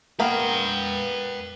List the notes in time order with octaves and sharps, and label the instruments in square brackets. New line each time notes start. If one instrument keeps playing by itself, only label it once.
[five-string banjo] A#3 B3 A#4 [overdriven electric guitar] B4 G5